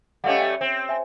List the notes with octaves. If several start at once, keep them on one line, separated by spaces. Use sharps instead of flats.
G3 A3 C#4 D#5 F5 F#5
E5
C4
E5 G#5